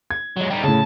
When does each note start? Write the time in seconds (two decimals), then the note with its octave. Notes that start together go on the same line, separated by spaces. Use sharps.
0.11 G#6
0.37 F#3 G#3
0.50 G3 D#4
0.63 A2 C#3 A5